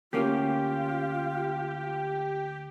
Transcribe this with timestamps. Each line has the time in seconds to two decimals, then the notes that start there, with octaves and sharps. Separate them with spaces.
0.13 D2 A#3 C#4 F4 G4 G5